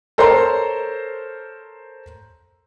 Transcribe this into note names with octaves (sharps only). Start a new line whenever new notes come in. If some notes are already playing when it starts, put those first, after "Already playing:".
A4 A#4 C5 C#5 A#5 C6